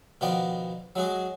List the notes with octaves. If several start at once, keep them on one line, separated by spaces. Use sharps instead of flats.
B2 D#3 F3 B3 D5 G5
F#3 G#3 F#4 G#4